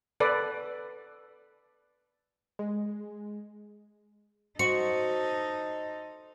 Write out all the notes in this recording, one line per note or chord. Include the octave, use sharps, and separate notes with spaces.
A4 B4 D5
G#3
D#4 F#4 A4 C5 D#5 C#7